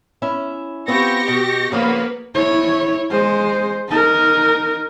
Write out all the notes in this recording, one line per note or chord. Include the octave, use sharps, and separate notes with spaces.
C#4 E4 E5
B3 C4 F4 G4 C#6 A#6
B2
C#3 F3 A#3 B3 B4 F5
E4 C#5
G#3 C5
D#4 A#4